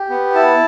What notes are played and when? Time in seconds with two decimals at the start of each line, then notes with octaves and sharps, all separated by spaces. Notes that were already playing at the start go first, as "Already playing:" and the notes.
Already playing: G4
0.10 B3
0.35 E4 A5